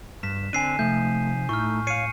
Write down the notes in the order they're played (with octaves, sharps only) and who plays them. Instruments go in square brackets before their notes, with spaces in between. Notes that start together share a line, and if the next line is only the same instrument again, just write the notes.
[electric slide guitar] G2 [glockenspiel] B6 E7
[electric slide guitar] D3 C4 D4 [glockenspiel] G#5 C7 D#7
[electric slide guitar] C3 F3 D#4 [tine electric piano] A3 [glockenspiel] G6
[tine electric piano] A2 [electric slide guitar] A3 D#4 [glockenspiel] C#6 F6
[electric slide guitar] C#5 F5 [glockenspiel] C7 C#7 D#7